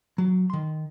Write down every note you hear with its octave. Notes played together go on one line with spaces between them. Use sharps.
F#3
D#3 C6